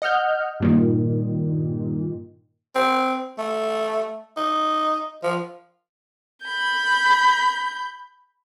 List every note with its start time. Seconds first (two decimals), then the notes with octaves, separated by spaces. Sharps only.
0.02 D#5 F#5 F6 G6
0.60 G2 A#2 D#3
2.75 C4
3.38 A3
4.37 D#4
5.23 F3
6.45 B5 G6